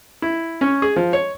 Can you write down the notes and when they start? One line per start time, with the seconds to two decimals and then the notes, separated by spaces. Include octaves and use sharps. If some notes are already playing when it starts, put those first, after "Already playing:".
0.22 E4
0.61 C#4
0.82 G#4
0.96 F3
1.13 C#5